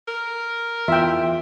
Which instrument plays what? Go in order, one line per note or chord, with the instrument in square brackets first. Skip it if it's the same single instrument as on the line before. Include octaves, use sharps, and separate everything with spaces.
[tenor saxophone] A#4
[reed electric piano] E2 [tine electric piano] F4 [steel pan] E5 G5